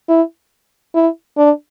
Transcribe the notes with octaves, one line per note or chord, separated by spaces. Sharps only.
E4
E4
D4